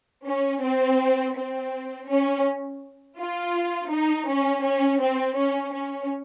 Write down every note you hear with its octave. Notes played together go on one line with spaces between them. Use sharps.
C#4
C4
C4
C#4
F4
D#4
C#4
C#4
C4
C#4
C#4